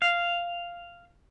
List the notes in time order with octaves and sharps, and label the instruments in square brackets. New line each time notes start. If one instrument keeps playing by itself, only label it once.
[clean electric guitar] F5